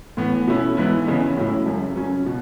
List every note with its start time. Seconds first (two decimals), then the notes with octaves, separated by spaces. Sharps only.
0.17 A2 E3 B3
0.47 B2 A3 C#4 E4
0.77 G#2 E3 B3 E4
1.07 C#3 E3 B3 D#4
1.37 A2 F#3 C#4 E4
1.66 F#2 C#3 G#3
1.96 C#3 F#3 C#4
2.26 B2